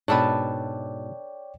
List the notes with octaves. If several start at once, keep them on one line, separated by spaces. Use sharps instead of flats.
G#2 B2 D4 A4 B4 C#5 D5 G5